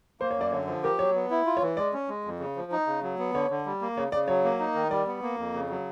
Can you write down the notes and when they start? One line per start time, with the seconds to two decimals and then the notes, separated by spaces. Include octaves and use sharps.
0.20 A#3 C5
0.31 C#5
0.36 F#2 D5
0.52 D3 C#5
0.67 F3
0.84 G4 A#4
0.99 F#3 C#5
1.15 B3
1.30 E4
1.46 F4
1.57 C#5
1.62 E3
1.77 G#3 D5
1.93 C#4
2.09 G#3
2.25 F2
2.40 C#3
2.56 F3
2.72 D#4
2.87 C#3
3.03 F#3
3.19 B3
3.34 D3 C#5
3.50 D3
3.66 G3
3.81 A#3
3.97 C#3 C#5
4.12 C#3 D5
4.28 F#3 C#5
4.44 A#3
4.59 D#4
4.75 D#3
4.91 G3 D5
5.07 B3
5.22 A#3
5.38 F2
5.54 C#3
5.69 F#3